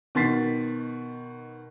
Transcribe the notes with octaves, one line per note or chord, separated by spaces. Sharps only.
B2 D#3 C6 A6 B6 C7